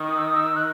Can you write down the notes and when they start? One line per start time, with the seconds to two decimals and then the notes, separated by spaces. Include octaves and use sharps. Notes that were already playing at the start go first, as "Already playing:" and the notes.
Already playing: D#3
0.11 D#6
0.18 E6
0.25 D#6
0.36 E6
0.56 F#6